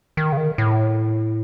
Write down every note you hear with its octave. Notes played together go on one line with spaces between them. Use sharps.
D#3
C#3
D#3
A2